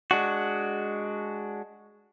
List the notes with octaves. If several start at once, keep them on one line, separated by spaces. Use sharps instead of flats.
G#3 D4 F#4